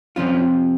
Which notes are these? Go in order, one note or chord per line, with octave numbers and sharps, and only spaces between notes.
F2 C3 F3 C#4 F4